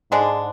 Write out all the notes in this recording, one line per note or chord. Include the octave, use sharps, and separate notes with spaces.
G#2 D3 G#3 D4